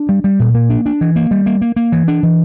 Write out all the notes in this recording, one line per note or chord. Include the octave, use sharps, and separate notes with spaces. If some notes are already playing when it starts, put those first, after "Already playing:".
Already playing: D4
G3
G3
A#2
A#3
D4
D4
E3
A#3
G3
A#3
A#3
A#3
E3
D4
E3